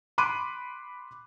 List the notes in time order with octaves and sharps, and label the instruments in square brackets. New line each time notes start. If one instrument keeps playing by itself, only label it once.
[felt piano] B5 C6 D6 F#6 D#7